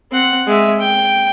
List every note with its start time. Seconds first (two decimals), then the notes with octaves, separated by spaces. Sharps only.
0.11 C4 F#5
0.47 G#3 E5
0.81 G5